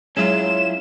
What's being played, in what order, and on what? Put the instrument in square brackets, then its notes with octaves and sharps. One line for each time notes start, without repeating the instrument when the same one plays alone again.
[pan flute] F#3 [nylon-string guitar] G#3 [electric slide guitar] C#4 E4 F4 [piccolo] E7